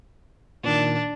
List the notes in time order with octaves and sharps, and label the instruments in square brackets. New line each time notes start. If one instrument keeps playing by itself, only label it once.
[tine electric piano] A#2 D#3 [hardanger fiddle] D4